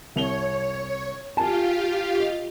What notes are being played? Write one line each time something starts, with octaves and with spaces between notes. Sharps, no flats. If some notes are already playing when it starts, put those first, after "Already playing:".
C2 C#5 F7 G7
F4 G4 F5 G#5 A5
D#5